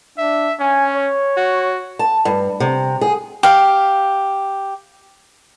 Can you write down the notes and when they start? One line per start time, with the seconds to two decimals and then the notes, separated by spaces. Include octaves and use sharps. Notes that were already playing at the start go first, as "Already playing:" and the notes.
0.18 D4 E5
0.60 C#4 G#5
0.95 C#5
1.37 F#4
1.99 A5
2.25 G2
2.60 C3
3.01 G#4
3.43 G4 F5